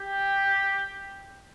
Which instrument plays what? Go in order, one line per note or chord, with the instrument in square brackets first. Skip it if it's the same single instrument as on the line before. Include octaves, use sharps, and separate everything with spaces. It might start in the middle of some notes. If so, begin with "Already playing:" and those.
Already playing: [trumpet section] G4